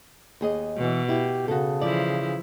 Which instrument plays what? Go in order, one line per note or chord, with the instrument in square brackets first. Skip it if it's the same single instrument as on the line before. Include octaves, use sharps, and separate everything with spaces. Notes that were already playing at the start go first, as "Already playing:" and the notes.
[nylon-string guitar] D#2 G#4 D#5
[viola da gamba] B2 [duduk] E3
[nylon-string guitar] E4 [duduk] G4
[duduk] C#3 [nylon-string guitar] F#4 A4
[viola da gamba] E3 F3 E4 [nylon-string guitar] D5